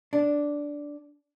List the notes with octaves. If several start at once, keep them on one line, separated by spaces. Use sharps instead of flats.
D4